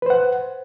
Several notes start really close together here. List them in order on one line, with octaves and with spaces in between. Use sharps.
B4 C5 F#5